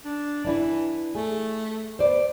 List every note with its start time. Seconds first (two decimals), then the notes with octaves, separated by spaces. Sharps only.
0.05 D4
0.45 E3 D4 E4 B4
1.15 A3 G#4
1.99 B3 C5 D5